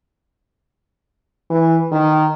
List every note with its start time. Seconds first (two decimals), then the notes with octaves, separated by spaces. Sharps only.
1.50 E3
1.92 D#3